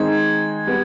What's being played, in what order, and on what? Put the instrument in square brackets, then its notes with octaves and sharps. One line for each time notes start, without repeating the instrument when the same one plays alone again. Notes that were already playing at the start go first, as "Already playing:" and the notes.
Already playing: [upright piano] D#3 G#3 C4 D#4 [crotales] G#6
[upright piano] G3 B3